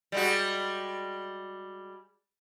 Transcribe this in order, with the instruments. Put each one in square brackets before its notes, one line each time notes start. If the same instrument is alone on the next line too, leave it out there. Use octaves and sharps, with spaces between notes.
[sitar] G3 G#3 F#4